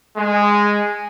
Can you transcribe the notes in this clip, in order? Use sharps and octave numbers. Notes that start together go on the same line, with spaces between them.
G#3